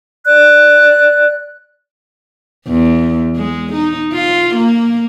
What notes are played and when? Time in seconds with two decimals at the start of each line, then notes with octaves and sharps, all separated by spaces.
0.25 D5 F#6
2.68 E2
3.36 G#3
3.73 D#4
4.13 F4
4.55 A#3